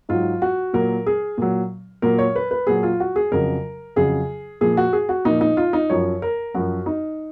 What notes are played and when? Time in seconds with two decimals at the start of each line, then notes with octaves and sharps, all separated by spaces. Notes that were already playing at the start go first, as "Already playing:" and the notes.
0.09 G#2 F#3 F4
0.42 F#4
0.73 A#2 F#3 A#4
1.06 G#4
1.38 A#2 F#3
2.02 A#2 F#3 A#4
2.18 C#5
2.36 B4
2.51 B4
2.67 A#2 F#3 G#4
2.83 F4
3.00 F#4
3.16 G#4
3.32 F2 C#3 F#3 A#4
3.96 F2 C#3 F#3 G#4
4.61 A#2 F3 G#4
4.77 F#4
4.93 G#4
5.09 F#4
5.25 A#2 F3 D#4
5.41 D#4
5.57 F4
5.73 D#4
5.90 F#2 F3 C#5
6.22 A#4
6.55 F#2 F3 F#4
6.86 D#4